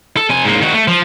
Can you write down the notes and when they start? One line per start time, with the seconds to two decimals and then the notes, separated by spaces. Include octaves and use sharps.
0.17 A4
0.30 C3 G#5
0.44 G#2 A#3
0.61 D#3 F#4
0.73 A3
0.88 F3